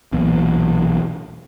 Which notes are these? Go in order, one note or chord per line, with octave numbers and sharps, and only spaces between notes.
E1 B1 E2 A#2